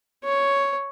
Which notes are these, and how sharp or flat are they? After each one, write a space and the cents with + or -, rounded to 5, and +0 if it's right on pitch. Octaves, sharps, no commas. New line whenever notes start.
C#5 +5